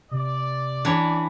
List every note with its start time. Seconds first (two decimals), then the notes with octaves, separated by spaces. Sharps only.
0.11 C3 D5
0.85 E3 D4 C#5 A#5